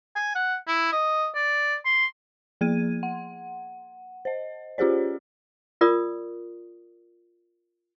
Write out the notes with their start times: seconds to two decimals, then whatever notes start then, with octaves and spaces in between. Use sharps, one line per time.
0.16 G#5
0.35 F#5
0.67 E4
0.92 D#5
1.35 D5
1.85 C6
2.61 F3 A#3 G#4 G#6 D#7
3.03 F#5
4.25 C5 D#5
4.78 C#4 F4 G4 G#4 C5 D5
5.81 F4 A#4 D5 D#6